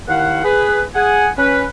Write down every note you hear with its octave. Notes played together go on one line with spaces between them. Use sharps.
D#2 D#3 E4 F5 F#5
G#4 B4
G#4 F#5 G#5
C#4 B4